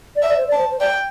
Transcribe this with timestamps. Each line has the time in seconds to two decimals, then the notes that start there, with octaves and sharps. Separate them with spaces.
0.16 D5
0.22 E5
0.29 D5
0.37 C5
0.47 D5 A5
0.58 C5
0.71 C5
0.80 D5 G5